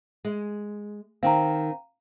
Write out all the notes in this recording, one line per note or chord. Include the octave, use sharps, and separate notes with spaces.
G#3
D#3 C4 F5 G5 A#5